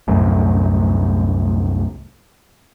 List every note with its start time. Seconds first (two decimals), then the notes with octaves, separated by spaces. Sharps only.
0.08 C2 F#2 A2